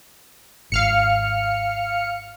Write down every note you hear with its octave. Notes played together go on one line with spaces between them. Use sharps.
G#1 F5 F6 C#7